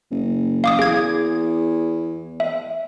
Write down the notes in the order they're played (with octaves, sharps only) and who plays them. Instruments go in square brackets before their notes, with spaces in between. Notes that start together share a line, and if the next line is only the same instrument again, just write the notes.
[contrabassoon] F#1
[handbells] F5 D6 D#6
[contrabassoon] E2 [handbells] G#4 G#6
[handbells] E5